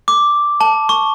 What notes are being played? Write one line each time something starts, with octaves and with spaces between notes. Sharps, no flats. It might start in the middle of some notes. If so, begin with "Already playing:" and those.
D6
A5
C#6